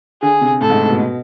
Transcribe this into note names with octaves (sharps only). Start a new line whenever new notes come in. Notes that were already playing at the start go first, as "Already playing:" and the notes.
D3 G#4
C3
A2 A4
G#2
A2
B2